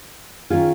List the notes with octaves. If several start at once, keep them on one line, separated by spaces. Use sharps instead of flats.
D#3 C#4 F4 G#4